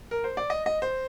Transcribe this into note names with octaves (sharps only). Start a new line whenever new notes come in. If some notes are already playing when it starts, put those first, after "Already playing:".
A#4
C5
D5
D#5
D#5
C5